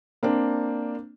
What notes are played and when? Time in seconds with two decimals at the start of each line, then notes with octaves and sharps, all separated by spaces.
0.23 A#3 C4 D4